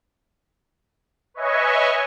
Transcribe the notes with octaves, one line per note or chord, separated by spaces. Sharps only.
B4 C#5 D#5 E5 G#5 C#6